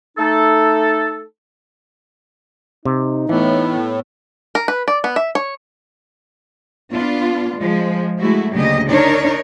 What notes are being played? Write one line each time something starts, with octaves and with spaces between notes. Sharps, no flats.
A3 D#4 A4
C3 D#4
A2 E3 B3
A#4
B4
D5
B3
E5
C#5
B3 D4 F4
F3 G#3
G#3 A3 E4 F#4
D2 C#3 F#3 A#3 G4 D#5
D4 D#4 A#4 C#5